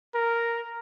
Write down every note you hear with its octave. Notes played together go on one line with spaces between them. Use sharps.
A#4